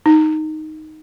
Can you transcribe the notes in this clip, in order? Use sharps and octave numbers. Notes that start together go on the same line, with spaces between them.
D#4